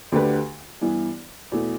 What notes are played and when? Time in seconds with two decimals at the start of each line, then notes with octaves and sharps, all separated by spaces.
0.12 D2 D3 A3 G4 B4
0.81 G2 E3 B3 E4
1.52 E2 B2 A3 E4